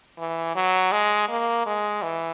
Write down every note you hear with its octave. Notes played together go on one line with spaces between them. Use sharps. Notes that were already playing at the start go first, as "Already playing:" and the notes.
E3
F#3
G#3
A#3
G#3
E3